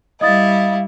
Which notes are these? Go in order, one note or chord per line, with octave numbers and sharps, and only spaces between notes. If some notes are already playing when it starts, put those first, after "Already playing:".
G3 E4 D#5 F5 D#6 A6